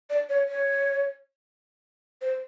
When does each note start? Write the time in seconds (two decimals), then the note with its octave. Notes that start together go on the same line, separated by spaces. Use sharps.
0.10 D5
0.29 C#5
0.49 C#5
2.21 C5